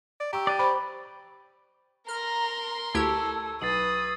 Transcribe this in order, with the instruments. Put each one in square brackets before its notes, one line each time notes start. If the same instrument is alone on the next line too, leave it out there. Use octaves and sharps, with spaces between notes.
[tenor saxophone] D5
[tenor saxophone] G4 [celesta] A#5 C#6 E6
[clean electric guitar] D5 [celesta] F#6 D#7
[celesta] C5 C#6 [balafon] B5
[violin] A#4 C6 [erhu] A#5 [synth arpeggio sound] F6
[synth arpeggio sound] D2 E4 G4 [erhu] A4 [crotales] C#6 E6 G#6
[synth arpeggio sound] B1 [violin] B4 [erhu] D#6 [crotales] A6 C7 F#7